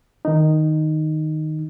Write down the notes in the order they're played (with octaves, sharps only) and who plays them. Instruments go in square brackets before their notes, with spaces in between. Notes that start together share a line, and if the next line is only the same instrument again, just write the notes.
[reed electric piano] D#3 D#4